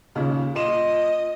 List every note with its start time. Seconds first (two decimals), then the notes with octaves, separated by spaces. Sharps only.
0.15 D#2 A#2 C#3
0.56 A#2 D#5 C6 E7